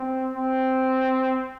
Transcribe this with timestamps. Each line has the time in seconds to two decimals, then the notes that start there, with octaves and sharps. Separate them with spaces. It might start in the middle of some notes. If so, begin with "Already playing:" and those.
Already playing: C4
0.34 C4